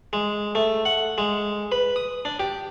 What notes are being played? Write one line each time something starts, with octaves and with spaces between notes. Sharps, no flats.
G#3
A3
F#5
G#3
B4
D#6
D4
G4